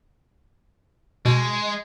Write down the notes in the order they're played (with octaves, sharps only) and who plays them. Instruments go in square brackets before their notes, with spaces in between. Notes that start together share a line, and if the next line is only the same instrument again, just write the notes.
[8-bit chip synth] B2 [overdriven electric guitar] G#3